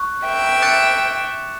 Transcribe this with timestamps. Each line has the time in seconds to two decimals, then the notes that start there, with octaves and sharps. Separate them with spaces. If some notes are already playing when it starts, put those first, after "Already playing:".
Already playing: C#6 F#6
0.26 E5 G5
0.62 D6 F#6 A6 C#7 E7